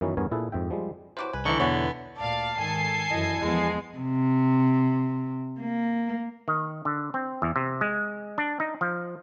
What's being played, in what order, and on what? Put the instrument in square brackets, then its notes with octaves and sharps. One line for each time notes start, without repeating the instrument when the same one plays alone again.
[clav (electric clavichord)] F#2 D#3 E3 F#3 B3 C#4
E2 G2 B3 A#4 C#5 G#5
A#2 E4 G#4 A4 B4
F2 G#2 E5 G5
F3 G3 G#3
[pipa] C3 E3 F#3 [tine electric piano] C5 D6
[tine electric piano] C2 G#5 [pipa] B4
[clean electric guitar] D3 E3 [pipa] D#4 D5 [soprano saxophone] C#6
[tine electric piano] E2 B2 [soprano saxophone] B3 [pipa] C#5 F#5 G#5
[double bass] D2 A#2 [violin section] D5 F5 [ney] A5
[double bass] G#2 D#3 [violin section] A4 G#5 C7
[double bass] F#2 E3 [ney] E4 [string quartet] D#5
[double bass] E2 B3 [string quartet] F3 G#3
[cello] C3
A#3
[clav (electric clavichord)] D#3
D3
C4
E2
C3
G#3
D4
D#4
F3